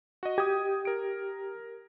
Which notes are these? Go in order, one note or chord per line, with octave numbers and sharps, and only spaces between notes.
F#4 D#5
G4 G5 D#6 G#6
A#4 D7